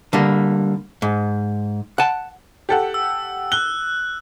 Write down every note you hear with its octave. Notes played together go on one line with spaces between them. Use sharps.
D3 G3 A#3
G#2
F#5 A5
G4 A4 F#5
E6
F#6 G7